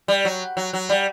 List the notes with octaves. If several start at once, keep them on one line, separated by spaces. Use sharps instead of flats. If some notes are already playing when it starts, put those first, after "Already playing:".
G3
F#3
F#3
F#3
G3